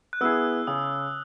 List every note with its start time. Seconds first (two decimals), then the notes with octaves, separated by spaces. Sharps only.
0.13 F#6
0.21 B3 E4 G#4 E6
0.67 C#3 D#6